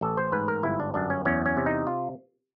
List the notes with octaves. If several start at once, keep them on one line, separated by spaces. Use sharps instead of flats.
A1 A4
C5
G#2 B4
A#4
G1 E4
D4
F#2 D4
C#4
E2 C#4
C#4
C3
D#4
F4